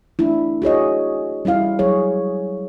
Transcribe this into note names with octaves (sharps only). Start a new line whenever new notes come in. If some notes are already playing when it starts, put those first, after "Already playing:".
A3 D4 E4
F#4 G#4 C#5 D#5
G3 C#4 E4 F5
F#3 G#4 C#5